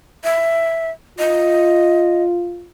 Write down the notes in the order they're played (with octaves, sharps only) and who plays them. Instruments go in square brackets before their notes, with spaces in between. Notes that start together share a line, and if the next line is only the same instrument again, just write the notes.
[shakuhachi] E5
[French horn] F4 [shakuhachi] D#5